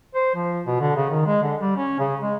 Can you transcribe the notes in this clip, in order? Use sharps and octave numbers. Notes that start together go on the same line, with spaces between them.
C5
F3
B2
D3
C#3
D#3
G#3
D3
G3
C#4
C#3
G#3